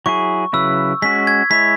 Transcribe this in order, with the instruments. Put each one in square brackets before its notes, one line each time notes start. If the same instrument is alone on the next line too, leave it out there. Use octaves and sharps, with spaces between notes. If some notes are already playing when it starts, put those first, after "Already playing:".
[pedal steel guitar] F#3 E4 G#4 [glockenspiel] C#6
[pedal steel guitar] C#3 F#3 E4 B4 [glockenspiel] E6
[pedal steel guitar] G#3 C#4 F#4 [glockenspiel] B6
[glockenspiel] G#6
[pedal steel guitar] G#3 E4 C#5 [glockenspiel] B6